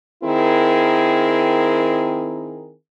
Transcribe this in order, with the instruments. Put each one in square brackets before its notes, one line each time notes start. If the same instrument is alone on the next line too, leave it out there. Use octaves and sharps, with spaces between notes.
[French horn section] D#3 C4 E4 G#4 A#4